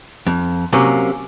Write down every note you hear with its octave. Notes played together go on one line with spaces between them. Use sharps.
F2
C3 F#3 A#3 C#4